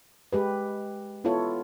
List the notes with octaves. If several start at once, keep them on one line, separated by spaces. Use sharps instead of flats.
G#3 G4 B4
B3 E4 F4 A4 C#5